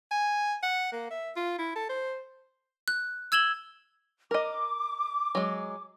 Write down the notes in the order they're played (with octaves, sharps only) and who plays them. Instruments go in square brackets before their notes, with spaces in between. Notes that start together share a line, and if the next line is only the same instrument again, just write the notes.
[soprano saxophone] G#5
F#5
A#3
E5
F4
E4
A4
C5
[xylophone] F#6
E6 G#6 E7 F#7 G7
[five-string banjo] A#4 D#5 [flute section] D6
[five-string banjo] F#3 G#3